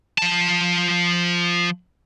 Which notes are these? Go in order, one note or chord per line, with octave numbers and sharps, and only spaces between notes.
F3 A5